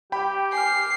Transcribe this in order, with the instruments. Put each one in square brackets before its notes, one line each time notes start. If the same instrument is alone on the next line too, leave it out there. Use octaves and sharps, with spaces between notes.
[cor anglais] G4 [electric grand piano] G5 B5
[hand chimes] G#5 D6 F6 [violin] C7